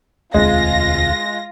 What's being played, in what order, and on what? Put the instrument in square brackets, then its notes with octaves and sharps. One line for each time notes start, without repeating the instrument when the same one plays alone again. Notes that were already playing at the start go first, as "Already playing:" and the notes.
[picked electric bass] E1 D2 C4 [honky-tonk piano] G#3 [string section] F4 A#6